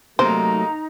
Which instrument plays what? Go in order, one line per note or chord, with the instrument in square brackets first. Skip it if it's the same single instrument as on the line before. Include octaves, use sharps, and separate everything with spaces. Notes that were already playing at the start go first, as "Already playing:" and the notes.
[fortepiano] C3 A#3 [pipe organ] F#3 A3 [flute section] D#4 A#5 [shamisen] C5